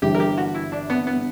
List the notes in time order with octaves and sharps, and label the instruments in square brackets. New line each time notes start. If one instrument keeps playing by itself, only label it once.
[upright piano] G1 G2 E3 [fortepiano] G4
[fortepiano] A#4
G4
F#4
E4
D4
B3
B3